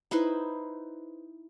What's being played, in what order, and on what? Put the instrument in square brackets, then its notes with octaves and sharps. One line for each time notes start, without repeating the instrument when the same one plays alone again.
[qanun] D#4 E4 B4 C5